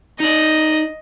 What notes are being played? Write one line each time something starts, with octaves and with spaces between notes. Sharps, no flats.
D#4 D5 D#5